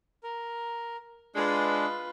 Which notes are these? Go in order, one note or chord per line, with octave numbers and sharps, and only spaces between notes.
A#4
G#3 D4 F4 B4